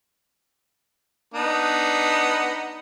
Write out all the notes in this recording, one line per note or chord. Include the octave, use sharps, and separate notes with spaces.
B3 D4 D#4